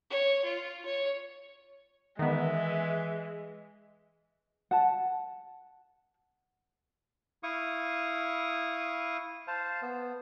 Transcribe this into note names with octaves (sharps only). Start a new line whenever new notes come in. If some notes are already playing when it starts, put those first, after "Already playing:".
C#5
F4
C#5
D#3 E3 G#3 B3 E5
F#5 A5
E4 F5 C#6 D#6
C5 F5 A5
B3